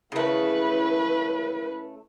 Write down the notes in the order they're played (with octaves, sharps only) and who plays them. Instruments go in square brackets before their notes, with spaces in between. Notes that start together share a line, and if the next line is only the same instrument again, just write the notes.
[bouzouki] C#3 A3 [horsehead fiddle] E4 B4